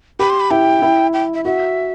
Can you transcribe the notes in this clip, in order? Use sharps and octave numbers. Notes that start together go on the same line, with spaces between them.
G4 B5
C6
B5
E4 G5
E4
G5
E5
F#4 E5